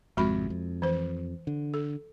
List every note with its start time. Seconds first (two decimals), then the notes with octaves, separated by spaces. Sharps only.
0.17 G#1 F2 C3 G#3 F#4 B5
0.50 F2
0.82 E3 C5
1.47 D3
1.74 A4